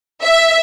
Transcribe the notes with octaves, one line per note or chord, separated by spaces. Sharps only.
E5